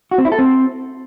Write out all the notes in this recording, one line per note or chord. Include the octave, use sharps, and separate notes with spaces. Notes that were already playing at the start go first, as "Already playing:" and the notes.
F#4
C4
E4
A4
C4